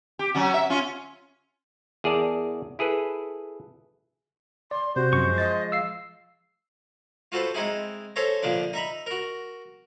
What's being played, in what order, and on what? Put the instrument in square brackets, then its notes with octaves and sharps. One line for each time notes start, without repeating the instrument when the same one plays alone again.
[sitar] G4
F#3 C#4 F#4
E5
C#4 F4
[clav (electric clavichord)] E2 G#4 A#4 D5 A5
E4 G#4 A4 B4
[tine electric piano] D5 [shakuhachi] C6
[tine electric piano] C3 [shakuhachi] F#4 [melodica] C5
[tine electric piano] F#2 [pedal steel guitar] F3 G#3 C#6
[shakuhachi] D#5 [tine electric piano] A6
[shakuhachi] F5 [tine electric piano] E6 C7
[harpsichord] F4 F#4 A4 B4 C5
G#3 C4 D#4 E4 G#4
G#4 A4 C5 C#5 E5 A#5
A#1 A#2 D3 F3 D4
D#4 E5 A#5 B5
F#4 A#4